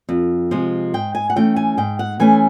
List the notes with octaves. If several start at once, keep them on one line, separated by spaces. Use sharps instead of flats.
F2
C3 F3 G#3
G#2 G5
G#5
F#5
E3 A3 C#4 G5
G#5
G#2 G5
F#5
E3 A3 C#4 G#5